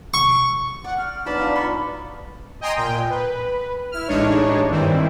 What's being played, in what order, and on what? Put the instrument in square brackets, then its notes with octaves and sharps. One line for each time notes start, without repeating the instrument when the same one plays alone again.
[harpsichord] C#6
[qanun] D5 [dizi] F#5
[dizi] F6
[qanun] F#3 B3 D#4 [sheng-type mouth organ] D4 A5 B5
[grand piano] F4 D5
[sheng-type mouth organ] D5 C#6 [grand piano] B5
[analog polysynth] D#5 G5 G#5 A#5 C6 D#6
A#2 G5
B4
E4 F6
A1 G#3 D4 D#4 C#5
G2 D#3 E3 C4 E4